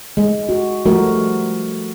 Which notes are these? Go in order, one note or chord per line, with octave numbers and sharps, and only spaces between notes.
G#3
F#4
F3 G3 A3 F#4 A#4